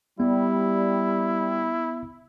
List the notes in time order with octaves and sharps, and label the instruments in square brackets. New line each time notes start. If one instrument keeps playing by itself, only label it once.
[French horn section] G3 [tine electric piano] B3 [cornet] E4